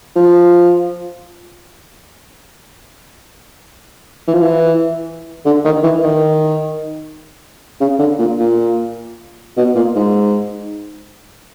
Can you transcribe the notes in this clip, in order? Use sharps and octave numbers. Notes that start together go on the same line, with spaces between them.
F3
E3
F3
E3
D3
D#3
E3
D#3
C#3
D3
A#2
A#2
B2
A#2
G#2